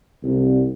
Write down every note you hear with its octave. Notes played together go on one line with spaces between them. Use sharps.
C2